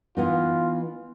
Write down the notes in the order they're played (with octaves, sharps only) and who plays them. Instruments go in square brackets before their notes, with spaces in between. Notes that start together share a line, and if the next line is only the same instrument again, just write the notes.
[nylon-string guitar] E3 B3 D#4 [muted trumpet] F4